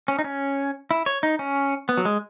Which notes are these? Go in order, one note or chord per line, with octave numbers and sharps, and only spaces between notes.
C#4
D#4
C#4
E4
C#5
D#4
C#4
B3
F#3
G#3